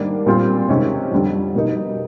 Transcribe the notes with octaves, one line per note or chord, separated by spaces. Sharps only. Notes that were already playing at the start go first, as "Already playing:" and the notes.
Already playing: G#2 D#3 G3 A#3 D4
A#2 G3 C4 F4
C3 D#3 G#3 C#4
F2 D3 G3
B2 G3 A#3 D#4